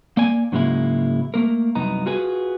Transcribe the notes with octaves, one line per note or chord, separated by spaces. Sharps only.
A#3 D5 G#5
G#2 C#3 F#3 G#3 A#3 E4
A3 A#3 A#4
C2 F#2 B3 D#4 A#5
F4 F#4 G#4 B4